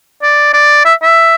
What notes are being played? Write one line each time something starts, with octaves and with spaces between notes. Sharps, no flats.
D5
D5
E5
E5